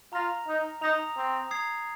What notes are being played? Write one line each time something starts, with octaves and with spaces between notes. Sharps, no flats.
F4 A#5 F6 A#6 F7
D#4
D#4 A#5 D#6 A#6 F7
C4
A#5 D#6 G#6 C7